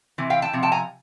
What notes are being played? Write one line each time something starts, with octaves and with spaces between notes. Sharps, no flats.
C3 E3
F5 G5
G5 A5
C3 F3
G5 A5
G#5 A#5